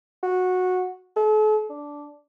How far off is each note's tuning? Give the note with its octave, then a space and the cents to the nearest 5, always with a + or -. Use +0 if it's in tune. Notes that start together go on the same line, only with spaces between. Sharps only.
F#4 -15
A4 -40
D4 -10